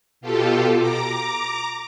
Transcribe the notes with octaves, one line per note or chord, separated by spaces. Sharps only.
B2 F4 G4 A4
A#5 D6